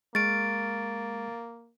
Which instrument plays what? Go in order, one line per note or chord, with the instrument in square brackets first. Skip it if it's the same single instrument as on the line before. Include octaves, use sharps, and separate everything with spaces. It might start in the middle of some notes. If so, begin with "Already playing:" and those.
[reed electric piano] G#3 C#6 F6 [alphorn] A#3 [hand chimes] A6 D7